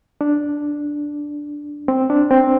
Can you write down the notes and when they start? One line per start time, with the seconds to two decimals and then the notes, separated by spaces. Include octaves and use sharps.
0.21 D4
1.88 C4
2.10 D4
2.31 C4